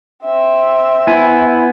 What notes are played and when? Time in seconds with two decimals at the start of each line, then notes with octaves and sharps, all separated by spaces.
0.25 C4 E5
1.07 B3 E4 G#5